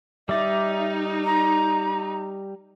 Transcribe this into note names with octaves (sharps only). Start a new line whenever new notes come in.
G3 D#4 D5 E5
A#5